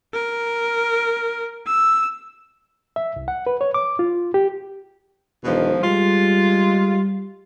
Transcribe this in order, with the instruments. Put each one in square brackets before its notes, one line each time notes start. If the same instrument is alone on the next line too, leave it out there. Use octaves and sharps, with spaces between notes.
[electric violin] A#4
E6
[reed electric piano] E5
C2
F#5
B4
C#5
D6
F4
G4
[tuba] E1 [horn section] B2 D#3 F3
[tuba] G3 [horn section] G#3 F4